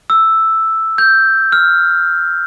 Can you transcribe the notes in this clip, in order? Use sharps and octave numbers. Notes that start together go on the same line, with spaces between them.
E6
G6
F6